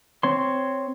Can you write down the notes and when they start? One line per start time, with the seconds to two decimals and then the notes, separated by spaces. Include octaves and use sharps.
0.23 C4 C#5 C6